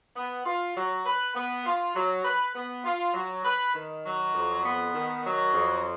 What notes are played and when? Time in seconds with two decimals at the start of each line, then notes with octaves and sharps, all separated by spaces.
0.16 B3
0.45 F4
0.75 F#3
1.06 B4
1.35 B3
1.65 F4
1.95 F#3
2.24 B4
2.55 B3
2.84 F4
3.14 F#3
3.43 B4
3.74 D#3
4.04 F#3
4.33 F2
4.64 B3
4.94 D#3
5.24 F#3
5.53 F2